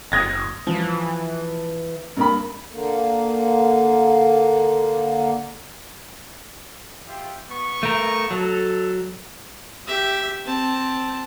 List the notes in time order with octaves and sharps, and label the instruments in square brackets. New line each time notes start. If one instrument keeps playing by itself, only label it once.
[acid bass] F#1 [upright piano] D#6 G#6 A#6
[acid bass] E3 [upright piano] F3
[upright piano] G2 A#3 B5
[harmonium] D3 A#3
[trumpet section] F4 G4 E5
B3 C#6
[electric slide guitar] A3 A#4
[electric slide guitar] F#3 [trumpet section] A4
[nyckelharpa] G4 E5
C4 A5